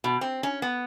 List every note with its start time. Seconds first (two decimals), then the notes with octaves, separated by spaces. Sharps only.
0.04 B2
0.21 C4
0.43 C#4
0.62 B3